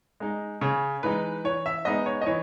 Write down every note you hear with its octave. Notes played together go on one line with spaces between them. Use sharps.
G#3 D#4
C#3 C#5
E3 G#3 D#4 B4
E3 C#5
E5
G#3 B3 D#4 D#5
C#5
D#5
E3 C#5